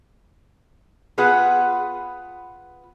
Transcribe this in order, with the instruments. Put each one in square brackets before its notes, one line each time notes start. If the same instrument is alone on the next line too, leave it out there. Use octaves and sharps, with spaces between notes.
[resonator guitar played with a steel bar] B3 F4 G#4 B4 F#5